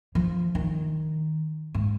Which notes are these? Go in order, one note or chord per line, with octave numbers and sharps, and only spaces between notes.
F3
D#3
G#2